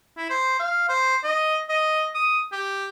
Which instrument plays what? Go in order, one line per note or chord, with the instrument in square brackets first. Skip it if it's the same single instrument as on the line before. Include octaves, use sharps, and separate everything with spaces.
[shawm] E4
C5
F5
C5
D#5
D#5
D#6
G4